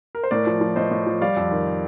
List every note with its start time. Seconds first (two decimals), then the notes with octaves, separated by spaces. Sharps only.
0.15 A#4
0.24 C5
0.31 A2 A#4 D5
0.47 F3
0.61 F3
0.76 A2 C5 D#5
0.91 A2
1.06 F3
1.21 G3 D5 F5
1.37 F2
1.51 D#3